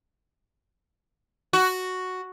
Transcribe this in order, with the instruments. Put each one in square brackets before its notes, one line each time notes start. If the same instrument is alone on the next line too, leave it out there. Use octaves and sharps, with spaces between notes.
[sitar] F#4